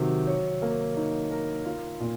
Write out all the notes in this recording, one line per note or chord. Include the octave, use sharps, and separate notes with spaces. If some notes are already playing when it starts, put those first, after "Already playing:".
Already playing: C3 D#3 F#3
C#5
A#3
D#4
A#4
F4
A#2